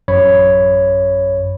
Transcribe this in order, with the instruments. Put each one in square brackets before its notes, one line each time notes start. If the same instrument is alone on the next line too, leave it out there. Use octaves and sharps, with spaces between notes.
[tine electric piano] A1 F#2 C#5 B5